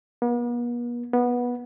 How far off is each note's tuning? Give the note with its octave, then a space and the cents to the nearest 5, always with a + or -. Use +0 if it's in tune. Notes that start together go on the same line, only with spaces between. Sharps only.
B3 -45
B3 -15